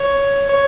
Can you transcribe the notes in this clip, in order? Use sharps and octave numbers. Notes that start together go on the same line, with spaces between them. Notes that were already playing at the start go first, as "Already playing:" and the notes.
Already playing: C#5
C#5